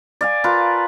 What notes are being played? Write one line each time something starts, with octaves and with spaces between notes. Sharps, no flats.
D5 F5 G#5
F4 A#4 B4